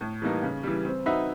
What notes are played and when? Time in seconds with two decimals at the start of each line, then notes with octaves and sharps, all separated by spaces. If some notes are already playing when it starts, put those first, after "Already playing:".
0.01 A2
0.22 E3 G3 A#3 D#4
0.43 C#3
0.63 E3 G3
0.85 C4
1.06 D#4 F#4 B4 E5